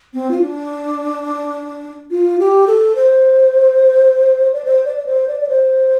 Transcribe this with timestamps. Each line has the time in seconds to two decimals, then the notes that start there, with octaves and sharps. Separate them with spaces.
0.13 C4
0.30 F4
0.41 D4
2.11 F4
2.39 G4
2.67 A4
2.95 C5
4.53 D5
4.64 C5
4.85 D5
4.96 D5
5.06 C5
5.27 D5
5.40 D5
5.49 C5